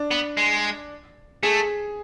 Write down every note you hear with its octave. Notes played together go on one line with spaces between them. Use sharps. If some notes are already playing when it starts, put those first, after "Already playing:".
Already playing: D4
B3
G#3
A3 G#4